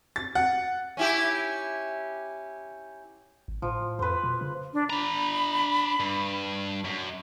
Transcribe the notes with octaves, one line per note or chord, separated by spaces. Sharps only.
A6
F#5
C#4 E4 G4
G#1
A2 F3
F2 B4 C5
B2
C#3
D4
D4 A#5 B5
G2
F#2